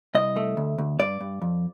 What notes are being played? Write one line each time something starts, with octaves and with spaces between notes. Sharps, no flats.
C2 D#5
A3
D2
D2
G2 D5
G2
F2